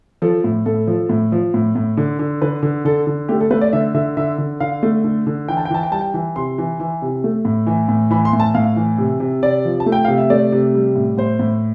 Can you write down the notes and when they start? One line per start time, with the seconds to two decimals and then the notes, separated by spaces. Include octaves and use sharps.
0.22 F3 A4
0.44 A2
0.66 A2 A4
0.87 F3
1.09 A2
1.32 F3
1.54 A2
1.75 A2
1.97 D3
2.19 D3
2.42 D3 B4
2.63 D3
2.85 D3 A4
3.07 D3
3.29 A3 G4
3.40 A4
3.51 A3 B4
3.61 D5
3.73 D3 E5
3.94 D3 E5
4.17 D3 E5
4.38 D3
4.60 D3 F5
4.83 A3
5.04 D3
5.27 D3
5.48 E3 G5
5.57 A5
5.65 G5
5.71 E3 A5
5.83 G5
5.92 G3 A5
6.01 G5
6.14 E3
6.36 C3 C6
6.58 E3
6.80 E3
7.02 C3
7.24 A3
7.45 A2
7.67 E3
7.89 A2
8.11 E3 B5
8.25 C6
8.33 A2
8.40 A5
8.54 A2 F5
8.76 E3
8.98 C3
9.20 C3
9.43 C3 D5
9.65 F3
9.80 A5
9.86 A3
9.92 G5
10.05 C3 F5
10.18 E5
10.30 A3 D5
10.52 C3
10.74 G3
10.96 A2
11.17 A2 C5
11.39 A2